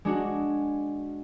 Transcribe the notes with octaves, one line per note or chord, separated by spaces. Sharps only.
G#3 D4 F#4